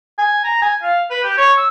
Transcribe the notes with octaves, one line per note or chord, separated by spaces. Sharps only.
G#5
A#5
G#5
F5
B4
G4
C#5
E6